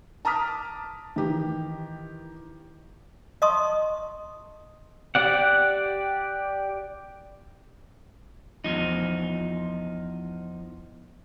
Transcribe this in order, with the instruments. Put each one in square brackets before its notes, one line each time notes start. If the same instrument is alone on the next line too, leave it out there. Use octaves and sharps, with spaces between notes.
[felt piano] A5 A#5 D6 D#6 F6 B6
D#3 E3 D#4 G4
[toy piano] D#5 E5 A5 C6 C#6 D#6
[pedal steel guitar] G4 D5 F#5
[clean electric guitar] E2 F3 D#4